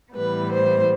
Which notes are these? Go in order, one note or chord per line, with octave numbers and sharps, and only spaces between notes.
A2 E3 G3 B3 B4
C5